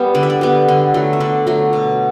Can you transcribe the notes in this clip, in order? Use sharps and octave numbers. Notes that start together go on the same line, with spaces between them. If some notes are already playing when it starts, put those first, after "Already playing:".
Already playing: G3 B3 F#5
D3 D5
E5
D5
G3 B3
D3
F#3 A3
E5
D3 D5
F#3 A3
B2